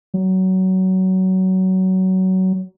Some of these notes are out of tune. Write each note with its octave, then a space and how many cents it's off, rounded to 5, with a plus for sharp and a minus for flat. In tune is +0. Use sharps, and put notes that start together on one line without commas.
F#3 +20